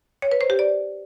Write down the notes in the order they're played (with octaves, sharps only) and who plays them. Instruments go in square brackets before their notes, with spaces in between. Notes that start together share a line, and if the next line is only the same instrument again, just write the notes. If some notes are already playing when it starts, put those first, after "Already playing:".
[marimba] C#5
B4
C5
G4
D5